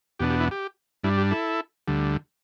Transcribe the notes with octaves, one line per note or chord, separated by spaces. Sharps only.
E2 B2 B3 D4 G4
G4
E4
G4
G2 G3 D4 E4
G4
E4 A4
D2 D3 G3